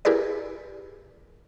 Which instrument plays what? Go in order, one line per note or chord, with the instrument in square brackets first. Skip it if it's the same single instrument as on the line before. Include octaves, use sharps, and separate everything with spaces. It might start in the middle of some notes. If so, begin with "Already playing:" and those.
[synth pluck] E4 G4 G#4 A#4 B4 D5